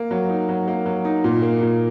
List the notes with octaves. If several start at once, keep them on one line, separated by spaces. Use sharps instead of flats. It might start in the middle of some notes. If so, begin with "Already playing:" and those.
Already playing: A#3
F#3
D#4
F#3
A#3
F#3
D#4
A#2
A#3
A#2